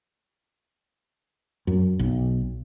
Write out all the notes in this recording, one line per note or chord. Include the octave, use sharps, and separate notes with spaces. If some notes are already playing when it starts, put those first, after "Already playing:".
F#2
B1